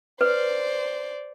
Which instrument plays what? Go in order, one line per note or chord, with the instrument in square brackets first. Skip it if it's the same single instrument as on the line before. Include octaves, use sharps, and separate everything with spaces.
[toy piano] B4 [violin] C5 D5